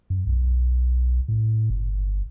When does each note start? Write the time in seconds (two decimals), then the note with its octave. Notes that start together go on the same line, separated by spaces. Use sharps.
0.10 F#2
0.27 B1
1.28 A2
1.70 G1